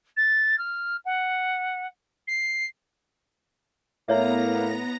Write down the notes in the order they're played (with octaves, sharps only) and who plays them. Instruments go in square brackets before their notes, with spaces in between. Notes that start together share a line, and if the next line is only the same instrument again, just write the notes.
[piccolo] A6
F6
F#5
C7
[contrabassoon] A2 [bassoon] A#3 [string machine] B3 A#5 A#6 [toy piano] E4 C#5 E5